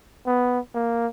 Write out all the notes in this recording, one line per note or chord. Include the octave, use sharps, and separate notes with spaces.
B3
A#3